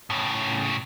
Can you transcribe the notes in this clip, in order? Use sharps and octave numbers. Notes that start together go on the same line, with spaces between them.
A2 C#3